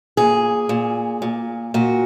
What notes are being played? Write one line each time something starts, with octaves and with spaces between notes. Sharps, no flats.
A#2 G#4
A#2
A#2
A#2 F#4